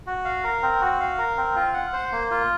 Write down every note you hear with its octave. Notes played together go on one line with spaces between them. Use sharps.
F#4
F5
A#4
C4
F#4
F5
A#4
C4
F4
F#5
C5
A#3
F4